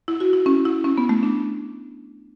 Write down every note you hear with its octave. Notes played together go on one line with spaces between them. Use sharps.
E4
F#4
E4
C#4
E4
C#4
B3
A3
D4